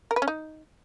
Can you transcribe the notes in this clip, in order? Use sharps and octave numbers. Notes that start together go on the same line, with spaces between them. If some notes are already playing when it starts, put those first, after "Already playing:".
A#4
B4
C#4
D#4